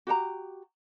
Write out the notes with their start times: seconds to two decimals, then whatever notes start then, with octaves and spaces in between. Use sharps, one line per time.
0.07 F#4 G4 F#5 A#5